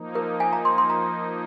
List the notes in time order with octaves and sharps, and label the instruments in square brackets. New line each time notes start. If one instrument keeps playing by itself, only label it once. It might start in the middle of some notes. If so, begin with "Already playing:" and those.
Already playing: [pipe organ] F3 A#3 D#4
[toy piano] A#4
G#5
A#5
C6
C6
A#5